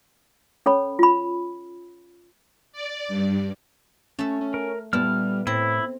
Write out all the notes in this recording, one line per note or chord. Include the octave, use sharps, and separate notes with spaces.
C#4 A4 C#5 B5
F4 B5
D5
G2
A3 C#4 E5
C#4
A#4
A#2 G3 B3 E4 A4 F6
A2 C4 E4